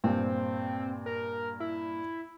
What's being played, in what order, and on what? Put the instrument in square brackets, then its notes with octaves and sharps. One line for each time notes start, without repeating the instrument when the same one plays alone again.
[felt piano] G2 A#2 [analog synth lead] C4
[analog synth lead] A#4
E4